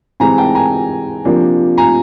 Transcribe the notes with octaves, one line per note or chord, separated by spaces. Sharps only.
C3 E3 G#3 C4 G#5 A#5
G5 A5
G#5 A#5
C3 F3 A#3 D4
G#5 A#5